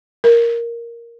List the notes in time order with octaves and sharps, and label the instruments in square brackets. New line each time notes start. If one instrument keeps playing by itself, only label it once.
[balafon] A#4